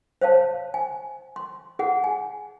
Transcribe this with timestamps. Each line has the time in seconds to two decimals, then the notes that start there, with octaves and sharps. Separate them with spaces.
0.21 C5 C#5 F5 A5
0.74 G#5
1.36 C6
1.79 G#4 F#5
2.04 G#5